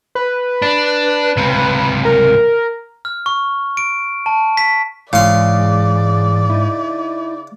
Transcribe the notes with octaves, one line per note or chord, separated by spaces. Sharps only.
B4
D4
C#2 C3
A#4
F6
C#6
D7
A5
B6
G#2 C#3 E3 G#3 D5 C6
D#4 E4